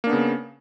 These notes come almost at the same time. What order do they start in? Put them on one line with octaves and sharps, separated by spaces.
A#3 D4 B3 C#3